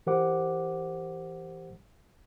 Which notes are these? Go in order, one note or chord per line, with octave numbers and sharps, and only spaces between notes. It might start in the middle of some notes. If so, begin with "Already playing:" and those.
E3 G4 A#4 C5 F#5 D6